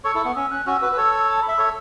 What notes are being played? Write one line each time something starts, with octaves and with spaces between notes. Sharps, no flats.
A4 C#5 C#6
E4 A4
B3
C#4 E6
C#4 F#6
C#4 F#4 E6
F#4 B4
B4
A4 C#5
A5
B5
E5
A4 C#5 E6